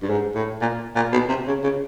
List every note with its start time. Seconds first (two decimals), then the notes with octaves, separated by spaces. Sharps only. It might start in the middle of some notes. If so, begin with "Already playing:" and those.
0.02 G2
0.09 G#2
0.35 A2
0.61 A#2
0.95 A#2
1.12 B2
1.29 C3
1.47 C#3
1.63 C#3